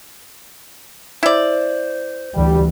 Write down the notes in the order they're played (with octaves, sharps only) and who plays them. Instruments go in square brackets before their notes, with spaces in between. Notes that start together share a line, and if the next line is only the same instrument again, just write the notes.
[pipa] E4 D5 [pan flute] C5
[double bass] D2 E3 [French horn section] G3